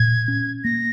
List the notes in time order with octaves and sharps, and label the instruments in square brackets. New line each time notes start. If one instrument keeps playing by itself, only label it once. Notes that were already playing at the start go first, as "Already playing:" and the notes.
Already playing: [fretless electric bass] A#2 [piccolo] G#6
[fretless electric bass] C#4
[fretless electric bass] A#3 [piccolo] A#6